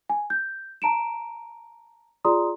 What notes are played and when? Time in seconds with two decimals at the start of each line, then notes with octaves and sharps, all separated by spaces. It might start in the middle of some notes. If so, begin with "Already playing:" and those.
0.10 G#5
0.30 G6
0.82 A5 A#5 D7 E7
2.25 F4 G#4 D5 A#5 C6 D#6